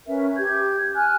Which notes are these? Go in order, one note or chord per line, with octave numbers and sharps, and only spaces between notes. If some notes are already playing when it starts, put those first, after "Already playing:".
C#4 A#4 B4 E5
G4 G6 G#6
G#5 F6 F#6